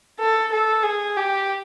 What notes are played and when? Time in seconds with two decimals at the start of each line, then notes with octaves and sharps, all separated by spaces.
0.20 A4
0.52 A4
0.83 G#4
1.17 G4